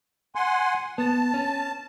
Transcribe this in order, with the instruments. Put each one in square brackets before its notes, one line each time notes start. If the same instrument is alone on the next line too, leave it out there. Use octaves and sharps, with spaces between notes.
[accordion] F#5 G#5 C6
[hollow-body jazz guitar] B3 [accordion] A5
[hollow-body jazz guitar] C#4